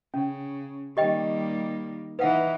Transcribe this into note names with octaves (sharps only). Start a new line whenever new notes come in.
C#3 C#4
D#3 G3 A#3 G4 D#5 G5
E3 D#4 B4 F5 F#5